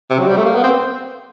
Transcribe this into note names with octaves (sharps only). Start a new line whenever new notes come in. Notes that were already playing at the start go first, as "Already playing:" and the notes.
C3
F#3
G3
A3
A#3
B3
C4